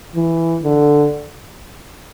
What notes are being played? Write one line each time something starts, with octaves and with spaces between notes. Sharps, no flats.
E3
D3